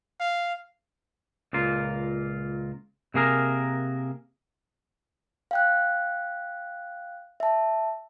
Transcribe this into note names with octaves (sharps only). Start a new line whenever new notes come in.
F5
C#2 A#2 A#3 F4
C3 A#3 G#4 A#4
F5 G5 F#6
E5 A5